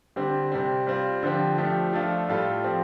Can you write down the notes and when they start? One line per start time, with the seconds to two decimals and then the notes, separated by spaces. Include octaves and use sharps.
0.16 D3 G3 C4 G4
0.52 C3 G3 C4
0.87 G3 C4 F4
1.23 D3 F3 C4 G4
1.58 F3 A3 D4 G4
1.93 F3 A3 D4 F4 A4
2.28 A2 G3 F4 A4
2.64 F3 C4 G4